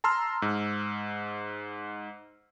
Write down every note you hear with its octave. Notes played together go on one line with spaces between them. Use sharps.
A5 A#5 C6 E6 F6
G#2